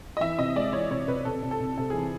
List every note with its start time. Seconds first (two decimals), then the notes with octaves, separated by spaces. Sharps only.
0.17 D#5
0.21 E3 E5
0.38 C3 D#5
0.56 G#3 D5
0.73 E3 C#5
0.90 C3 C#5
1.07 C3 B4
1.25 C3 A4
1.43 C3
1.51 A4
1.60 C3
1.77 C3 A4
1.90 E3 G#4